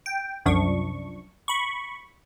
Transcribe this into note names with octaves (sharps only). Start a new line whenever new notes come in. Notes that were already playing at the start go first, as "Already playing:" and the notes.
G5
C2 F#2 F3 D4 C#6
B5 C#6